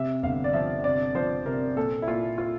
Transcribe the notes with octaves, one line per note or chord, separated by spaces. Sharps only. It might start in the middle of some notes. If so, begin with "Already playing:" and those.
Already playing: C3 E5
G1 F5
D5
F3 E5
C3 D5
F3 C5
C3 A#4
A#2 A4
E4
A#2 F4
F4